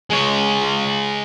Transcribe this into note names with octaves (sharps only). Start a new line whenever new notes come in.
G#3 C#5